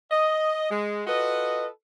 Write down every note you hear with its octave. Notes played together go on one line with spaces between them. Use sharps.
D#5
G#3
F4 F#4 A4 B4 D#5